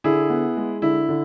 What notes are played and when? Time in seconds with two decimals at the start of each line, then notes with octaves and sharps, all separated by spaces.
0.04 D3 E4 G#4
0.30 B3
0.57 G#3
0.82 D3 E4
1.09 D3